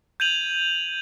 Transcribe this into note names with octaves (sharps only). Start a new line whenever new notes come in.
G6 G#6 D#7 F7 F#7